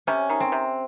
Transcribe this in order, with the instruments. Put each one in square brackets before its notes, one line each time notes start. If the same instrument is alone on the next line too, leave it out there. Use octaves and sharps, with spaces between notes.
[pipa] C3 [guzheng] C#4
[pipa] D#3
[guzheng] C4
[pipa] C3